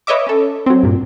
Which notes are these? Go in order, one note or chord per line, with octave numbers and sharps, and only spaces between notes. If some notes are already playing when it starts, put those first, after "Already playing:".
B4 C#5 D#5 E5 D6
C#4 A4
F#3 C4
G2 A#2